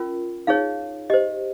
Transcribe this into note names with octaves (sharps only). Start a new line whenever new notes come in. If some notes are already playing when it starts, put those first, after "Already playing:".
Already playing: C#4 F4 A#4
D#4 G#4 C#5 F5
G4 C5 D#5